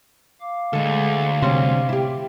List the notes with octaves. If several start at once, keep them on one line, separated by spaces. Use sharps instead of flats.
F5 D6
D2 G#3 A4
C3 G3 C#4 C5
E4 G4